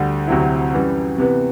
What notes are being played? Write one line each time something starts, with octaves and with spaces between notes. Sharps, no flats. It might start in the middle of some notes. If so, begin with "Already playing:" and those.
Already playing: D2 D3 G3
D2 C3 F#3 C4 E4
F#2 E3 G3
C3 E3 B3